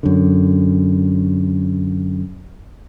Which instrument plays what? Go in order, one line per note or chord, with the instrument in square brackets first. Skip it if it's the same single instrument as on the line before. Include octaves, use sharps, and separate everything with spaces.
[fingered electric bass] F#2 D3